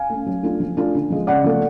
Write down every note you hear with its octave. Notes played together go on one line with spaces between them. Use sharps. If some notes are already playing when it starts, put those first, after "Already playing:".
Already playing: F5 G#5
A3 C#4
F#3
A3 D4 F4
F3
A3 D4 F4
D3
F3 G#3
C#3 D5 F#5
F3 A3